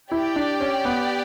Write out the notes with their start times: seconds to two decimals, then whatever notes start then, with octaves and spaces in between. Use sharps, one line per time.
0.12 E4 G4 D5 G5
0.36 D4
0.60 C#4
0.85 B3